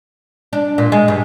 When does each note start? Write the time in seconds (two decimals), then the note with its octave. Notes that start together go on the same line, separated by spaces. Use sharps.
0.53 D4
0.78 A#2
0.92 G#3
1.08 G2